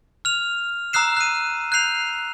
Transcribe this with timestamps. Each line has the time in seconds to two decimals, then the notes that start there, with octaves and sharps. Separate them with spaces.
0.25 F6 F7
0.93 A#5 D#6 E6 F#6 C7 E7
1.17 F#6 D#7
1.72 F#6 G6 C7 F7